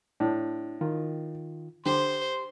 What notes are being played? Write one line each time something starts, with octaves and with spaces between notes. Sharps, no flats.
A2 D4
D#3 F4
D3 G4 C5 C6